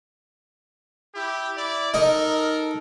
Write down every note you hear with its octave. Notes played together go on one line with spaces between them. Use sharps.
E4 G4
E4 D5
D#4 A4 A#4